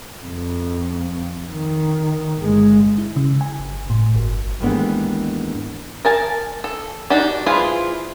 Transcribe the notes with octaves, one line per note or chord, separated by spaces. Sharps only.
F2
D#3
G1 G#3
E4
C#3
G#5
G1
A2
G1
D#2 G#2 E3 A3 B3 D4
A#4 G#5 A5
A4
D4 D#4 F#4 G4
E4 F4 G#4 B4 C5